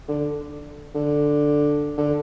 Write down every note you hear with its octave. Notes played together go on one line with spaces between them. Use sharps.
D3
D3
D3